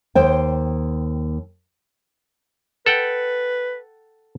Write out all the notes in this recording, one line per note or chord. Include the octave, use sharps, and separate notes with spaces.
D#2 C5 G5
A4 B4 F#5 G5